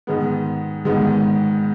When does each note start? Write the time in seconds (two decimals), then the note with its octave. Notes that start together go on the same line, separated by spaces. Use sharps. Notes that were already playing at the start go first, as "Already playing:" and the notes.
0.07 G#2 D#3 G#3 B3
0.85 G#2 D#3 G#3 B3